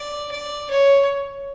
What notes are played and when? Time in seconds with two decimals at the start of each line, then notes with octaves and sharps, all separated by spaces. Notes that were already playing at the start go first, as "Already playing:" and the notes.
Already playing: D5
0.31 D5
0.70 C#5